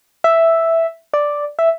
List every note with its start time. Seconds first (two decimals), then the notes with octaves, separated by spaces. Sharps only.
0.24 E5
1.14 D5
1.59 E5